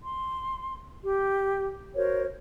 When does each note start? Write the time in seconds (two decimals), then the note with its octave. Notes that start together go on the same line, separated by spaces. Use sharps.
0.02 C6
1.04 G4
1.96 F#4 A#4 C5 C#5